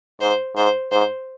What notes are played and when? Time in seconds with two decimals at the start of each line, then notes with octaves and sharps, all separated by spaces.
0.21 G#2 C5
0.56 G#2 C5
0.92 G#2 C5